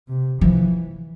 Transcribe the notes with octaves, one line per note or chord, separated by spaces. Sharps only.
C3
E3 F3